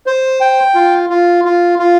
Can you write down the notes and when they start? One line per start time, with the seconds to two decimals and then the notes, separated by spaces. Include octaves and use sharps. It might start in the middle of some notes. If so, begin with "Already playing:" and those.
0.06 C5
0.40 G5
0.75 F4
1.10 F4
1.45 F4
1.79 F4